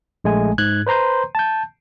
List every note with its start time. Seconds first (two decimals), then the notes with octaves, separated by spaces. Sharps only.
0.24 A#1 G#3 A3 G#5
0.58 G#2 F#6 G#6
0.87 B4 C5 A#5 C6 G6
1.35 A5 G6